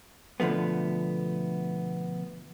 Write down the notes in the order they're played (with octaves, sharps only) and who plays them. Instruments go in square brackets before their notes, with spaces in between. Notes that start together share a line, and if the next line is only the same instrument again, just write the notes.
[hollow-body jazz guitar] B2 D3 F3 A3 B3